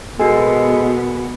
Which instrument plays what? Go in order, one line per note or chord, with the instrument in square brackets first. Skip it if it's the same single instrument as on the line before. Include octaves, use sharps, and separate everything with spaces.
[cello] B2 B3 [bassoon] G#3 [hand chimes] F#4 G#5 [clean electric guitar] A4 A#4